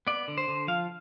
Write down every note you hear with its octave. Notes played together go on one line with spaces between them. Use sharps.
B3 D5
D3
C5
D3
F3 F5